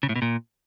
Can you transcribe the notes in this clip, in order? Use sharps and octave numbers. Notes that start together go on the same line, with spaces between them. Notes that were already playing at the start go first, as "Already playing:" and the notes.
C#3
A2
B2
A#2